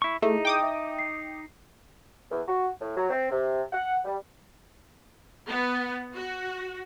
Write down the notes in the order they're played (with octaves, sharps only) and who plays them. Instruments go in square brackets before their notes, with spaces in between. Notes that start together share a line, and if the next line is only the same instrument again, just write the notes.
[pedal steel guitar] E4 C#6
[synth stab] A3 [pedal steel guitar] D#4 [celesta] E4 G#4 E5
[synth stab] G5 D6 D#6
[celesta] E5
C7
[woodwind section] E2
F#4
A2
F#3
C4
C3
F#5
G3
[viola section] B3
F#4